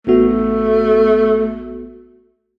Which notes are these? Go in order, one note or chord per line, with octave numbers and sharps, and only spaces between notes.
A1 A3 B3 F#4